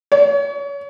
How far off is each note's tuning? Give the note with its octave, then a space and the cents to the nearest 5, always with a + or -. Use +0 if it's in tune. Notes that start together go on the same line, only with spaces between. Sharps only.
C#5 +30